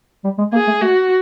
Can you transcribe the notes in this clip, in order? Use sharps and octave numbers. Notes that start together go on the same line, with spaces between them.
G3
G#3
A#3 G#4
A3
A3 F#4